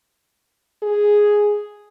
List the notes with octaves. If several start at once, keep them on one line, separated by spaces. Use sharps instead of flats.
G#4